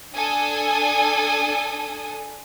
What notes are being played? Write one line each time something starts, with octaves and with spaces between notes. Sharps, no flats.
D4 A4 G#5 D#6